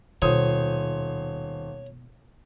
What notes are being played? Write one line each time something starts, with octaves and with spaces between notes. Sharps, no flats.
D#1 B2 C5 C#5 D#6